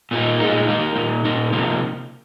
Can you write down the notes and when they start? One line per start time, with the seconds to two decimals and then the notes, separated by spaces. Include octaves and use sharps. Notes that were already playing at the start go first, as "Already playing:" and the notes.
0.11 A#2 A#3 D#4
0.40 A#2 G#3 D#4
0.67 D#3 A#3 D#4
0.96 A#2 A#3 D#4
1.25 A#2 A#3 D#4
1.53 C3 F3 A#3 D#4